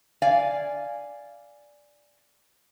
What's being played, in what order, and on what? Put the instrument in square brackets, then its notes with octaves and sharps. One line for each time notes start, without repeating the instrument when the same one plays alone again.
[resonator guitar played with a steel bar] D5 F5 G#5